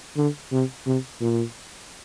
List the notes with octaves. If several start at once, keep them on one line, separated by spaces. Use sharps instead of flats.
D3
C3
C3
A#2